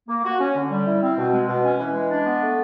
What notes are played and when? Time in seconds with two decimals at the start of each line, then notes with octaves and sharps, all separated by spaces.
0.08 A#3
0.24 F#4
0.40 C#4
0.55 D3
0.70 G3
0.87 E4
1.02 C4
1.17 B2
1.33 G#3
1.48 B2
1.63 C#4
1.79 E3
1.94 G#3
2.11 D4
2.25 B3
2.42 A3